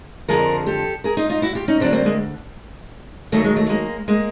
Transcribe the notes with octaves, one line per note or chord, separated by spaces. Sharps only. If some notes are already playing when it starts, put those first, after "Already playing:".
F2 D3 F3 G#4 A#4
G4 A4
G#4 A#4
D#4 F4
D#4 F4
E4 F#4
F4 G4
C#4 D#4
D2 D3 F#3 C4 D4
A#3 C4
G#3 A#3
D#2 D#3 F#3 A3
G#3
A3
G#3 A#3
G#3 A#3